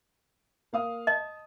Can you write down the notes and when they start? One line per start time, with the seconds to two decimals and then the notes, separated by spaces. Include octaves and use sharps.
0.73 A#3 F5 D#6
1.07 D#5 A5